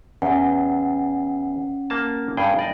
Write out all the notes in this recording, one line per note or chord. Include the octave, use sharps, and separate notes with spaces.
E2 C#4 F#5
A#3 A5
G2 G#4 G5
D5 D#5